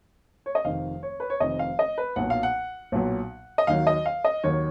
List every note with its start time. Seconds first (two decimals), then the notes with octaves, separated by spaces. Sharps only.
0.46 C#5
0.55 D#5
0.65 F1 F2 D#3 F5
1.03 C#5
1.20 B4
1.30 C#5
1.40 F1 F2 D#3 D#5
1.59 F5
1.79 D#5
1.98 B4
2.16 B1 A#2 F#3 F#5
2.30 F5
2.43 F#5
2.92 B1 A#2 F#3
3.58 D#5
3.67 D#2 D#3 F#3 F5
3.87 D#5
4.06 F5
4.25 D#5
4.44 D#2 D#3 F#3 C#5